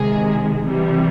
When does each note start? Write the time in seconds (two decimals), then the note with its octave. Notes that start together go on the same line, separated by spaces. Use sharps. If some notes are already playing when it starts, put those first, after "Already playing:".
Already playing: C3 D#3 G#3 G#4
0.63 C3 E3 G3